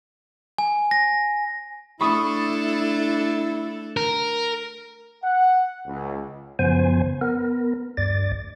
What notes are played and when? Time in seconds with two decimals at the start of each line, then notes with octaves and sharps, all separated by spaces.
0.58 G#5
0.91 A#6
2.01 A3 D4 E4 A4 B5 C#6 D#6
3.97 A#4
5.24 F#5
5.86 C#2
6.59 F#2 C#3 F3 B3 C5 G#5
7.21 B3 A#4
7.97 D2 G2 D5 A6